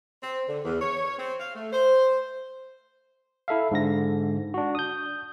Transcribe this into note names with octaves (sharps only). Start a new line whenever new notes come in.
C4
D3
E2
C#5
C4
F5
A3
C5
E4 A4 E5 F5
G#2 D3 A#6
D4 F#4
D#6 G6